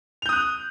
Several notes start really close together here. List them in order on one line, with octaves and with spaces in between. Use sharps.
F7 G6 D#6 F#6